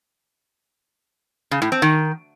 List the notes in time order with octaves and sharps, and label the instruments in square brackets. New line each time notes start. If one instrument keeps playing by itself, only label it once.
[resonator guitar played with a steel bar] C#3
A2
C4
D#3